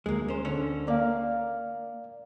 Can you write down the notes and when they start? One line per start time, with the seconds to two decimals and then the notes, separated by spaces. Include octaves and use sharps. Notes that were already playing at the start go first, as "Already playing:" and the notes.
0.06 D2 G#3 A#3
0.28 C#4 C5
0.45 D3 C#4 C#5
0.88 A#3 D5 F5